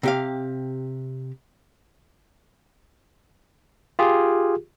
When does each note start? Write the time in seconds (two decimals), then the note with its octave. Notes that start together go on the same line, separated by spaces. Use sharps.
0.03 C3 G4 F5
3.99 F4 G4 G#4